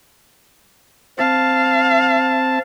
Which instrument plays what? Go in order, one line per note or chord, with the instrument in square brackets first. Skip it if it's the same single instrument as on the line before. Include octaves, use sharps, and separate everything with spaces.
[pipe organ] C4 A5 [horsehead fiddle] F5